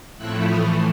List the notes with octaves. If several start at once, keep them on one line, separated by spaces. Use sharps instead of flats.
A2 F3 A3 C4 E4 E6 F#6
A2 E3 A3 D#6 F6